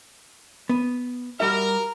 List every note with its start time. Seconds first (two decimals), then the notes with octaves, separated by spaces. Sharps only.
0.69 B3
1.40 G3 F#4 A#4 E5